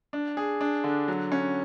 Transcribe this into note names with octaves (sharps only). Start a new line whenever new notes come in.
D4
G#4
D4
D3
F#3
C#4